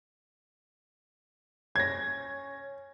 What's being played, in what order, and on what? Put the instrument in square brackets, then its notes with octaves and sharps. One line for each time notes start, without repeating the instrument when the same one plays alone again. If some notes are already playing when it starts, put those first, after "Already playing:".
[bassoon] C#4 [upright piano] G#6 A#6